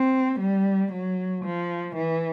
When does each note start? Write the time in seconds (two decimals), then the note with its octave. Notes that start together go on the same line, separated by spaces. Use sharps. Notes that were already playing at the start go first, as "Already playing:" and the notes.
Already playing: C4
0.40 G3
0.92 F#3
1.44 F3
1.95 E3